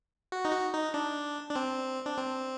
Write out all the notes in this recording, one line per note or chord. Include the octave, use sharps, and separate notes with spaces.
F#4
D#4
F#4
D#4
D4
D4
C4
D4
C4